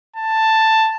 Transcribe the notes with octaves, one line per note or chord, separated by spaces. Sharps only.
A5